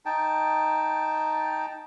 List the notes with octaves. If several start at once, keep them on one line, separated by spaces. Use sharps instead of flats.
D#4 G5 A5